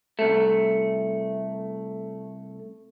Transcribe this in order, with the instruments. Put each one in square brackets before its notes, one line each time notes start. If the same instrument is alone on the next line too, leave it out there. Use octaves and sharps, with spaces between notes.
[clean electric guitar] C2 A3